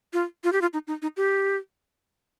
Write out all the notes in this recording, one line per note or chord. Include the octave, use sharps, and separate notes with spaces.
F4
F4
G4
F4
D#4
D#4
D#4
G4